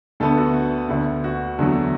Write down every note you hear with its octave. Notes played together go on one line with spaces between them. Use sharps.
D2 D3 A3 B3 A4
F#4
D2 D3 B3
F#4
E2 D3 F#3 A3